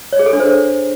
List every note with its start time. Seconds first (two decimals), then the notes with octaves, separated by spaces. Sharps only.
0.13 C#5
0.19 G#4
0.26 A4
0.33 D4
0.40 C5